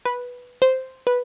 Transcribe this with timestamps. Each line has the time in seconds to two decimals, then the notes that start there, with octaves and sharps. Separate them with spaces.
0.05 B4
0.62 C5
1.07 B4